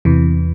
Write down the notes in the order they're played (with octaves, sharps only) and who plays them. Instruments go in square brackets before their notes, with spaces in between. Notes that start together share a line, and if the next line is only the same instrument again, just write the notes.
[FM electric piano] E2 C3 E3